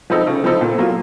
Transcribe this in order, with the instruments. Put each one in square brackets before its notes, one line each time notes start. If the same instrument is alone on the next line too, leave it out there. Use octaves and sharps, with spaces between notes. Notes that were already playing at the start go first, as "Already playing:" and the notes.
[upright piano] F3 C4 D#4 A4
C#3
F3 C4 D#4 A4
A#2
F#3 A#3 F4